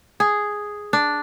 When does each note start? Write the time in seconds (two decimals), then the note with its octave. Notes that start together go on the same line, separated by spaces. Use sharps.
0.20 G#4
0.93 D4